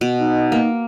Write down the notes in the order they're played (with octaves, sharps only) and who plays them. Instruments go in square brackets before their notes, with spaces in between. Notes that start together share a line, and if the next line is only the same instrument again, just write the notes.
[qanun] B2
[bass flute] D#4
[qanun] A#3